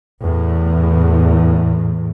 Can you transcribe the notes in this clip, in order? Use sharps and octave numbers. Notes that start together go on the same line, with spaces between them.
E2 A2